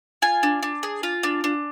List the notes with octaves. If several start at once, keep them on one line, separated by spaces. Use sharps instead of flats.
F4 G#5
D4
D4
G#4
F4
D4
D4